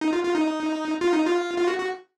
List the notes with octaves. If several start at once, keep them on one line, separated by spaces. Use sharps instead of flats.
D#4
F4
F4
D#4
F4
D#4
F4
F4
F#4
F#4